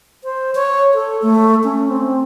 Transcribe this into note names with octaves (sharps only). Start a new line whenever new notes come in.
C5
C#5
A4
A3
C#4
C4